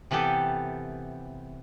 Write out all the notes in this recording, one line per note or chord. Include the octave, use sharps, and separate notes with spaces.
C3 E3 B3 G4 A4